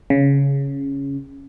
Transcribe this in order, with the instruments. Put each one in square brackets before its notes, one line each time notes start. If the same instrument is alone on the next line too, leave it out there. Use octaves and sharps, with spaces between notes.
[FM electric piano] C#3